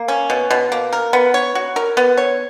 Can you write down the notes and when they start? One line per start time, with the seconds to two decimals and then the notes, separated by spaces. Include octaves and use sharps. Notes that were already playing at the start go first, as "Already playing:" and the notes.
Already playing: A#3
0.08 C#4
0.30 B2
0.50 B2
0.72 A#3
0.93 A#4
1.13 B3
1.34 C#5
1.55 F#4
1.76 A#4
1.97 B3
2.17 C#5